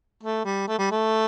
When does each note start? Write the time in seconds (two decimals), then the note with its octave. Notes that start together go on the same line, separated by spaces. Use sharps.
0.23 A3
0.45 G3
0.68 A3
0.79 G3
0.91 A3